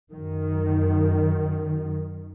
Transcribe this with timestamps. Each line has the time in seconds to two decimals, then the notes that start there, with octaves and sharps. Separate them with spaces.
0.11 F#2 D#3